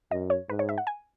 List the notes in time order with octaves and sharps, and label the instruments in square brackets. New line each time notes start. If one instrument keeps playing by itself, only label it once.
[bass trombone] F#2 [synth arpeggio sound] D#5
[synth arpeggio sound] C#5
[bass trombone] G#2 [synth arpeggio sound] B4
[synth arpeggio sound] C#5
E5
F#5
G#5